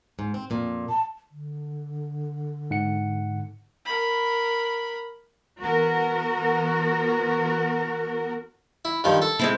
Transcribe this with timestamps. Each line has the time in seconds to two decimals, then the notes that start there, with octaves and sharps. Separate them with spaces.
0.19 G#2
0.34 C4
0.50 F2 A#2
0.89 A5
1.31 D3
2.71 G#2 F#5 C#7
3.85 A#4 B5
5.61 E3 B3 F#4 A#4
8.85 E4
9.04 G2 D#3 F3
9.22 A4
9.39 G#3 C4 E4